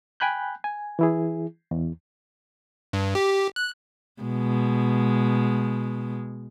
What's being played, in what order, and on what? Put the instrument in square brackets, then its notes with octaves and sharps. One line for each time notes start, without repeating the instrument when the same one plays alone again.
[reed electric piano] G5 G#5 B5 F#6 G6
G#5
E3 E4 G#4
E2
[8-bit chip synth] G2
G4
F#6
[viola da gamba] B2 G#3